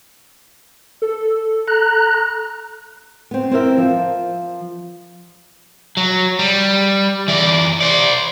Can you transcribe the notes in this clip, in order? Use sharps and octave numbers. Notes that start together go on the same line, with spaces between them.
A4
A#5 F#6
B3 C4
C4 E4 A#4 E5
F3
F#3
G3
E3 D5
C5 D5